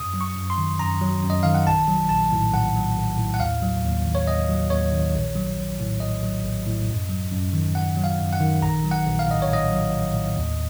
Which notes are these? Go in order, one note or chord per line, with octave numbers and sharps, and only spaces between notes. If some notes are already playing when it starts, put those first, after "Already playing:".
Already playing: F#2 D#6
F#3
C#6
F#2
C6
D#3
F#2 A#5
F#3
F#2
D#5
D#3 F5
F#5
A#1 A5
F#3
A#1 A5
A2
A#1 F#5
F#3
A#1
A2
F#5
D#2 F5
F#3
D#2
D#3
C#5
D#2 D#5
F#3
D#2 C#5
D#3
A#1
F#3
A#1
A2
A#1 D#5
F#3
A#1
A2
F#2
F#3
F#2
D#3
F#2 F#5
F#3
F5
F#2
F#5
D#3
A#1 A#5
F#3
F#5
A#1
F5
A2 D#5
C#5
A#1 D#5
F#3
A#1
A2
D#2